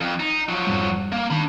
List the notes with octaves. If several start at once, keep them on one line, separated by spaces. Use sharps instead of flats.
F2
D#4
F3 F#3
F2 G#2 G3
A#3
D#3 D4 B5